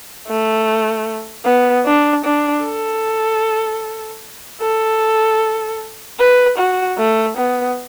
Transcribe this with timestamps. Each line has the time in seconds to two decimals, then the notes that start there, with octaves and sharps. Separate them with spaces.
0.28 A3
1.45 B3
1.86 D4
2.25 D4
2.64 A4
4.61 A4
6.19 B4
6.58 F#4
6.98 A3
7.37 B3